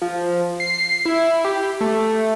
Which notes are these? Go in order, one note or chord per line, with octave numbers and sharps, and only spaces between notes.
F3
C7
E4
G4
A3